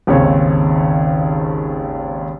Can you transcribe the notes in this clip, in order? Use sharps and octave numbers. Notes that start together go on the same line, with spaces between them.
G#1 D#2 C#3 C4 C#5